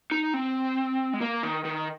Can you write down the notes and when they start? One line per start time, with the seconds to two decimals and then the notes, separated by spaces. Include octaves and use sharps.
0.11 D#4
0.34 C4
1.13 G#3
1.21 A#3
1.43 D#3
1.65 D#3